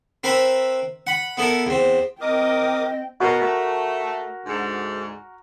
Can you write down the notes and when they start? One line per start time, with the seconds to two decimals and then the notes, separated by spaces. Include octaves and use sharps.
0.24 C4 A#4 B4 E5 A#5 B5
1.07 F#5 B5
1.37 B3 E4 A4 A#4
1.67 E2 C4
2.21 C4 A#4 D#5 G5 D6 D#6
3.20 B2 F#4 A#4
3.41 A3
4.45 D2 G#2